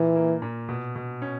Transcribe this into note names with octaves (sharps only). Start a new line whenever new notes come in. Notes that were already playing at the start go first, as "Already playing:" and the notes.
Already playing: A#2 E3
A#3
A#2
B2
B2
C#4